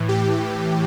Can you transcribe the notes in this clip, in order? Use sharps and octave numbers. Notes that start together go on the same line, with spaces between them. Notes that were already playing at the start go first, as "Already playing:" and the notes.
Already playing: A2 E3
G4